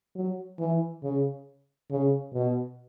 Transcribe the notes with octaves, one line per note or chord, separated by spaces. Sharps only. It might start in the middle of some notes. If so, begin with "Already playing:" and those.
F#3
E3
C#3
C#3
B2